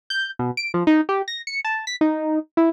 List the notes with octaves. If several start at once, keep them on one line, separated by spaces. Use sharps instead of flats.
G6
B2
D7
F3
D#4
G4
A#6
C#7
A5
B6
D#4
E4